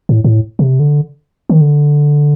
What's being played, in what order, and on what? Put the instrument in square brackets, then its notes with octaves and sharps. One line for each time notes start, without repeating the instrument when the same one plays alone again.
[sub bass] A2
A2
C3
D3
D#3
D3